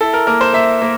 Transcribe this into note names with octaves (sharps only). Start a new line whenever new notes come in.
E4 A4
A#4
A#3 A#4
C5
A#3 E5
A#3